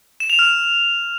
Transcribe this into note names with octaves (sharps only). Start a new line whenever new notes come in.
E7
F7
F6